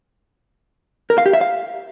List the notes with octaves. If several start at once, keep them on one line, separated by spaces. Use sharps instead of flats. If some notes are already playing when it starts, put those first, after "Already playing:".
A#4
F5
G4
E5
F5